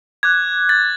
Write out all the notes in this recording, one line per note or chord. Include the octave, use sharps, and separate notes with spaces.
D6 F#6 G#6
A6